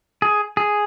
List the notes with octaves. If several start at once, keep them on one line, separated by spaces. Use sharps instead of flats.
G#4
G#4